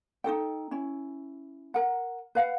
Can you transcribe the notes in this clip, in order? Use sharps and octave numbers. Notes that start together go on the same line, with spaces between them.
D#4 F#4 A4 G5
C#4 E4
A#4 F#5
B4 F5 F#5